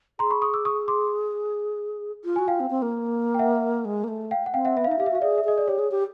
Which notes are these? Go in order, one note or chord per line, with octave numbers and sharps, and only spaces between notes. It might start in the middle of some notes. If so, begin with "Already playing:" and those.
G#4 A#5 C6
B5 C#6
C#6 D#6
D6 E6
C#6 D#6
C6 D6
F4
F#4 G#5
F4 F5 G5
C4
C4
A#3
G5
E5 F#5
G#3
A#3
A3
F5 G5
F#5
C4 F5 G5
E5 F#5
B3 E5
F5
D#4 E5
G4 F5
E5
F#4 F5
G#4 D5 E5
E5
G#4 D#5
D5
G4 C#5
G#4
G4